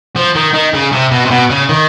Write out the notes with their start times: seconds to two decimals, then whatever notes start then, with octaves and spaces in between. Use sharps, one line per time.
0.16 F3
0.35 D#3
0.53 D#3
0.73 C#3
0.92 C3
1.11 B2
1.25 C3
1.31 B2
1.50 C#3
1.69 D#3